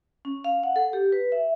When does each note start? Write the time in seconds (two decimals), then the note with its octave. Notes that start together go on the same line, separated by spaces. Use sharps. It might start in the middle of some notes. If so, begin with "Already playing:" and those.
0.25 C#4
0.44 F5
0.63 F#5
0.76 A4
0.93 G4
1.12 B4
1.32 E5